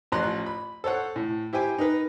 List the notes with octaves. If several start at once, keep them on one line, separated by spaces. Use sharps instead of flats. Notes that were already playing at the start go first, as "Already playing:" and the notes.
A1 F3 C#4 A#5 C6 F#6
B5
A4 C5 C#5 F#5
A2
E4 G4 C5 G5 G#5
D#4 A#4 B4